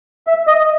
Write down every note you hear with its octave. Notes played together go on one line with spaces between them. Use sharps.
E5
D#5